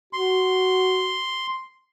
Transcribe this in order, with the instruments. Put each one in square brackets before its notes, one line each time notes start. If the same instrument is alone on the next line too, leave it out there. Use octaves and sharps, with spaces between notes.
[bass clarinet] F#4 [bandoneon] C6